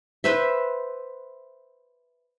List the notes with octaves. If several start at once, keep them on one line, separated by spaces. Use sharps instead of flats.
B4 C5 E5